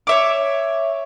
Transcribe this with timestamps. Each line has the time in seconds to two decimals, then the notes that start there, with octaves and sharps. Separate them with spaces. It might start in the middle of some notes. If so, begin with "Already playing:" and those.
0.07 C#5 E5 D6